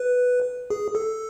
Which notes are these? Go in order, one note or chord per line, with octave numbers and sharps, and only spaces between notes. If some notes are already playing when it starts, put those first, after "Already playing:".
Already playing: B4
G#4
A4